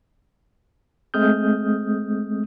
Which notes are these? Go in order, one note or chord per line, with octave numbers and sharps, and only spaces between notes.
G#3 A3 C4 D#6 F6 G6